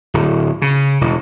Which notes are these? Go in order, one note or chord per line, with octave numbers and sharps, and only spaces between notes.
D1
C#3
E1